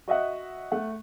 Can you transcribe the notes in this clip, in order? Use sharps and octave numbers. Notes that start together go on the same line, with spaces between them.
F#4 D#5 E5 F#5
A3 F#5